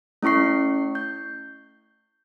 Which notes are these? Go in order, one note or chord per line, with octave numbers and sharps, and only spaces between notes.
A3 C#4 E4 C#6 C7
G6